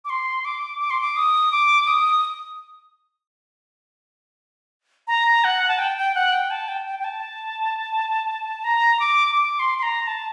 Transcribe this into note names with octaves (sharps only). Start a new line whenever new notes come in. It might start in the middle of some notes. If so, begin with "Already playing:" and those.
D6
C6
D6
D6
C6
D6
D#6
D6
D#6
A#5
F#5
A5
G5
G5
F#5
G5
A5
G5
G5
G5
A5
A#5
D6
D6
C6
C6
A#5
A5